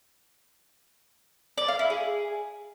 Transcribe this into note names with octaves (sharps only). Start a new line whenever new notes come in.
D5
F5
E4
G#4